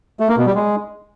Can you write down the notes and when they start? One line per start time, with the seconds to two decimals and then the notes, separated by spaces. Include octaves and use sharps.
0.20 A3
0.29 A#3
0.37 B2
0.46 G3
0.55 G#3